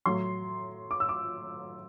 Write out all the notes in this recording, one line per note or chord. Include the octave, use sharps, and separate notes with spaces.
A2 F#3 C6
D6
E6
D6